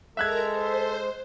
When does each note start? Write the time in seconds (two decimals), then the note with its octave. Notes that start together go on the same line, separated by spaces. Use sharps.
0.17 G#3 A4 A#4 E5 A#5 F#6 G#6
0.48 C5